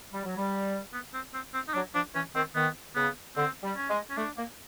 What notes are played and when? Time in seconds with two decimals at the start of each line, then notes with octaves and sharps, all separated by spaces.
0.13 G3
0.25 F#3
0.37 G3
0.93 B3
1.14 C4
1.34 C4
1.54 C4
1.68 D#4
1.74 F#3 D4
1.94 F3 D4
2.15 E3 C#4
2.35 D#3 C4
2.55 D#3 B3
2.96 C#3 B3
3.36 D3 C4
3.63 G3
3.77 C#4
3.89 G#3
4.10 C#4
4.17 A3 D4
4.37 A#3